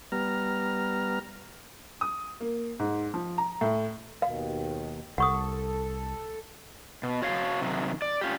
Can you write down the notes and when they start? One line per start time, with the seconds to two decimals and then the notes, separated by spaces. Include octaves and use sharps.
0.12 G3 B3 A#5 F6
2.01 D#6
2.40 A#3
2.79 G#2
3.14 F3
3.38 A#5
3.61 A2
4.22 D#2 B2 D#3 F5
5.18 C2 A4 F#5 C#6 D#6
7.03 B2
7.22 F#4 C#5 F5
7.61 C3 D#3 F#3
8.02 D5
8.21 C#4 F4 G4